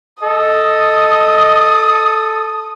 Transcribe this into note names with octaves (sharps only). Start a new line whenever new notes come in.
A4 D#5 D#6